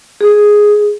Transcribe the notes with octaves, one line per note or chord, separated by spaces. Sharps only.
G#4